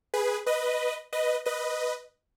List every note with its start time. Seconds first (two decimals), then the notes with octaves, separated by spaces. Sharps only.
0.14 G#4 B4
0.46 B4 D#5
1.13 B4 D#5
1.46 B4 D#5